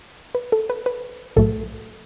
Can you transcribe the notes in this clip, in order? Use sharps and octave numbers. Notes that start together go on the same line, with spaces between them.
B4
A4
B4
B4
B1 A2 F#3 A3 A4